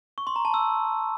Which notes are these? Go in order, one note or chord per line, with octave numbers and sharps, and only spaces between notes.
C#6
C6
A#5
A5
E6